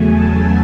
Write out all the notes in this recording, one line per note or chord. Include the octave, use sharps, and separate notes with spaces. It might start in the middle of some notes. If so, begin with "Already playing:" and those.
Already playing: E2 C#3 F#3 A3 G#5
A5